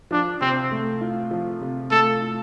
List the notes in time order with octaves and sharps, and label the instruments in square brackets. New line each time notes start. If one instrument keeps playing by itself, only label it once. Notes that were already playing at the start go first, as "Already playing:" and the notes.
[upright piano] F3 [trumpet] D4
[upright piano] C3 [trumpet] C4
[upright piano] A3
F4
F3
C3
[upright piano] A3 [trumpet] A4
[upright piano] F4